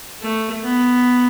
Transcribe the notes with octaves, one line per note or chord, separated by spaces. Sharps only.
A3
B3